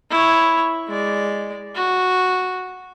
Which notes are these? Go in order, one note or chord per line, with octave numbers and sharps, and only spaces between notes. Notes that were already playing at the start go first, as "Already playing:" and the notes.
E4 C#5
G#3 D5
F#4